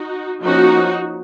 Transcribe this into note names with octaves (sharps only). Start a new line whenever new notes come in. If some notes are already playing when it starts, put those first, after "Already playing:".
Already playing: D#4 F#4
F3 A#3 C#4 D#4 F#4